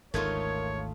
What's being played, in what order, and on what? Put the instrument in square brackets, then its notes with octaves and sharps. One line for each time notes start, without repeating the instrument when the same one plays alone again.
[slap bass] G#1 D2 [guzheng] A3 D#4 F4 [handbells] A#4 G#6 [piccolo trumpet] C#5